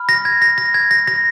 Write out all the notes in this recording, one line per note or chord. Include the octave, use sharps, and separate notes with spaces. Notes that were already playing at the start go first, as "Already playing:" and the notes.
Already playing: B5 F6
A#6
G#6
A#6
A#6
G#6
A#6
A#6